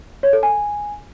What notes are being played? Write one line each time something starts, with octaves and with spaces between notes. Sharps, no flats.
C#5
A4
G#5